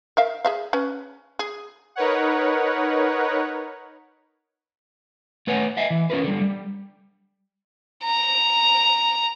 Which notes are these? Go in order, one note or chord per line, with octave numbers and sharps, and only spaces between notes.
A#4 E5 F5
G#4 E5 F5
C#4 B4
G#4
D#4 A#4 B4 C#5 F#5
A3 B4 C#5 F#5 G#5
D#5 E5 G#5
E3
C#4 F4 A#4 B4
D3 G3
G3
A#5